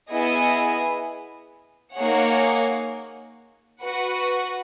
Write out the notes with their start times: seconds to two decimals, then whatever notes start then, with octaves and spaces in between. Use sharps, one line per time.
0.11 B3 E4 G#4 D#5
1.97 A#3 D#4 G#4 C#5 F#5
3.82 F#4 B4 F#5